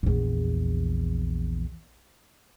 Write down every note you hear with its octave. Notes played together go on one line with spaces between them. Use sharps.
A#1 E2